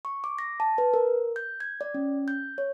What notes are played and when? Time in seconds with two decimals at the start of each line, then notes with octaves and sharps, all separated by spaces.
0.05 C#6
0.24 D6
0.39 A#6
0.60 A5
0.78 B4
0.94 A#4
1.36 G6
1.60 G#6
1.81 D5
1.94 C#4
2.28 G6
2.58 C#5